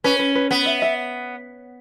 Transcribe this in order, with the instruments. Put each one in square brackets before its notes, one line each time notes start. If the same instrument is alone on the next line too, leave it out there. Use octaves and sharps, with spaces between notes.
[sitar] C#4 [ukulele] B4
[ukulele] B4
B4
[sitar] B3 [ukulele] B4
[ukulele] E5
E5